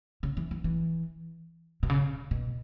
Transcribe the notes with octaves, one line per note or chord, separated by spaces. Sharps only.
C#3
E3
E3
E3
B2
C#3
B2